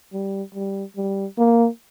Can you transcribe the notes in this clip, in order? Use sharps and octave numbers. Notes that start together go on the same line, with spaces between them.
G3
G3
G3
A#3